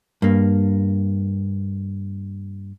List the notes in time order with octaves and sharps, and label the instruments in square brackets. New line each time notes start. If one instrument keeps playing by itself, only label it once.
[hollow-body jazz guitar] G2 A#3